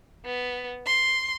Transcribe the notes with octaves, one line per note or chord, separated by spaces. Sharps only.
B3
C6